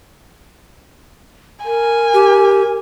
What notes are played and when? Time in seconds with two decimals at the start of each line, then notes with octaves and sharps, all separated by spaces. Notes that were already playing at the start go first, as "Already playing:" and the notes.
1.65 A#4 G#5
2.14 G4